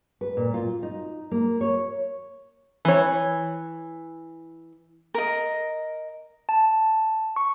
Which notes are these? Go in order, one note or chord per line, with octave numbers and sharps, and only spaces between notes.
B4
A#2
F4
D#4
A#3
C#5
E3 C#5
A#4 D#5
A5
C#6